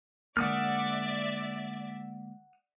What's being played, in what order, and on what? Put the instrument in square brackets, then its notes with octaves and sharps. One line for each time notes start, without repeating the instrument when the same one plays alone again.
[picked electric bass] D3 G#3 A#3 [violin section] D5 E5 [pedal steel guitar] F#5 D#6 F6